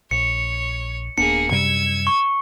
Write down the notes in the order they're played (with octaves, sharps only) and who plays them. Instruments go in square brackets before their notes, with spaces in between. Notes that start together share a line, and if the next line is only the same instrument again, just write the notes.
[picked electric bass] A#1 [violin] C#5 [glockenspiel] C#7
[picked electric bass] D#1 B3 D4 [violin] A#3 G#4 [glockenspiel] C#7
[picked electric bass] F#2 C3 G3 [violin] E6 G#6
[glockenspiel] C#6